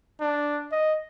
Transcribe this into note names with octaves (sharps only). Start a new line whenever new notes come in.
D4
D#5